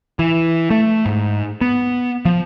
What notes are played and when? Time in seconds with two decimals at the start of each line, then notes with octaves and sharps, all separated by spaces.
0.19 E3
0.70 A3
1.06 G#2
1.61 B3
2.25 F3